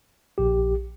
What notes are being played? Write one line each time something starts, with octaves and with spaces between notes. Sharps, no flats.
A#1 G4